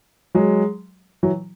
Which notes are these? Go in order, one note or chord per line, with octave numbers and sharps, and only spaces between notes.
F#3 G#3
E3 F#3